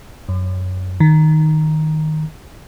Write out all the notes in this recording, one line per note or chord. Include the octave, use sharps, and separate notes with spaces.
F#2
D#3